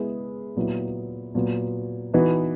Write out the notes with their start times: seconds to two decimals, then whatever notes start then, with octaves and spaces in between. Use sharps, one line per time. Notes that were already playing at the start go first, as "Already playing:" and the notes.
Already playing: G#3 B3 E4 G#4
0.56 A#2 F#3 B3 E4
1.35 A#2 F#3 B3 F#4
2.14 E3 B3 D#4 F#4